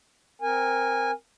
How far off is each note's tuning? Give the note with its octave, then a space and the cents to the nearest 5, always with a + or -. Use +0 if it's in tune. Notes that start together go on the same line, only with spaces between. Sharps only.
C4 +0 A#4 +5 G#5 -15